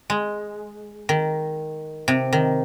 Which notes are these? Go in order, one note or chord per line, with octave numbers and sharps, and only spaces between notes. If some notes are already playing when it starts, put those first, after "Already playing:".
G#3
D#3
C3
D#3